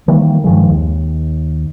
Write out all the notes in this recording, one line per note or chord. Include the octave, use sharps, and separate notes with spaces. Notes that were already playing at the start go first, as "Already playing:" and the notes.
D#3 E3 G3 A#3
G2 D#3 F3 G#3
D#2